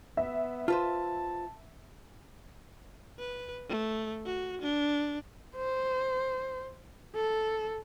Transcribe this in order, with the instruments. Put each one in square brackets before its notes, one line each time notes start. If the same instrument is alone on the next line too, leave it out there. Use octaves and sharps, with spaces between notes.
[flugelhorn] B3 [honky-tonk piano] E5
[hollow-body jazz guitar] F4 B4 C5 [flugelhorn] A5
[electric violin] B4
A3
F#4
D4
[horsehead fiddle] C5
A4